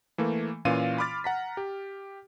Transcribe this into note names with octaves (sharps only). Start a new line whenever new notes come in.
E3 A3 A#3
A#2 E3 C#4 F4 F5 D#7
B5 C6 D6 F6 A6
F#5 A#5 B6
G4